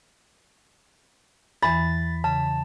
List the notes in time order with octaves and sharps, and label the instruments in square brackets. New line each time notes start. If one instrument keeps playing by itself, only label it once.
[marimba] E2 E3 [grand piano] B5 [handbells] A6
[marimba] C#3 [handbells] A5